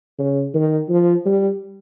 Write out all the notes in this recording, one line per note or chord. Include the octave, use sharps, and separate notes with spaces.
C#3
D#3
F3
G3